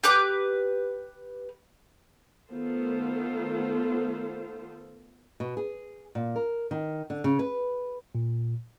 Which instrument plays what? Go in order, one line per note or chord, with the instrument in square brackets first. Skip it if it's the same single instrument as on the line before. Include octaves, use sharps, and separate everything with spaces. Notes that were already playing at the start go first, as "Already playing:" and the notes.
[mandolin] G4 B4 D6
[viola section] D#3 A3 B3 F4 A4 C5
[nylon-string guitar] B2
G#4
A#2
A#4
D#3
D3
C#3
B4
[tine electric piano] A#2